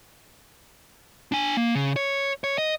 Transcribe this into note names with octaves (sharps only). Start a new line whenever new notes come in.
D4 G#5
A#3
C#3
C#5
C#5
D#5